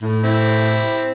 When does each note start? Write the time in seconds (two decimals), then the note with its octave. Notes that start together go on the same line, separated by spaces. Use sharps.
0.02 A2
0.24 C4 E4